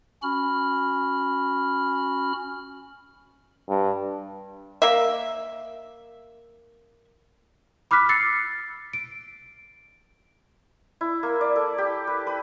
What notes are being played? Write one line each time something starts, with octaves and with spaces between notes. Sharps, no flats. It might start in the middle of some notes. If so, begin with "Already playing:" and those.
C#4 F#4 B5 F6
G2
A#3 E5
B5 D6 F6 F#6 B6
E6 A6 C7 C#7
D7
E4
A#3
D5
A4
G4
B4
B4